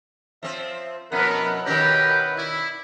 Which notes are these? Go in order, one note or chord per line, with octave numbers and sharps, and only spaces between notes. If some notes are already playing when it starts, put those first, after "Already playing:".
F3 C4 E5
F2 B2 B3 E4 A#4 B4 F#5
B2 D#3 C#4 G4 A#4 B4
E4 D5